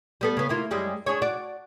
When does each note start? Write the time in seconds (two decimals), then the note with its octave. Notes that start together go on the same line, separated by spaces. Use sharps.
0.21 G3 B3 A4
0.37 C#3 B3
0.49 A#3 E4 F4
0.71 F#2 G3 G#3
1.06 D4 G#4 C#5
1.22 F#4 D5